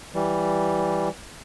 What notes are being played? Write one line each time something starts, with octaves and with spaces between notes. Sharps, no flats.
E3 G3